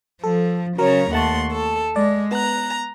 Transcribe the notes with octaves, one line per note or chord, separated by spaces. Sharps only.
F3 A4
C#3 F#3 A#4 C#5 A#5
D#2 A3 F#5 A5 C6 C#6
A4
G#3 D5
B3 A#5 F#6